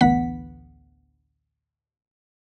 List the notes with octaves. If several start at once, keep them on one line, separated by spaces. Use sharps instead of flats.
A1 D2 E3 B3 F#5 B6